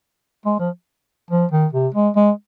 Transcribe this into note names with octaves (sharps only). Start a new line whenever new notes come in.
G#3
F3
F3
D#3
C3
G#3
G#3